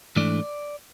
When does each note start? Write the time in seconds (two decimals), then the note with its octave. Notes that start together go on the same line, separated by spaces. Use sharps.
0.16 G#2 E3 A3 D4 D5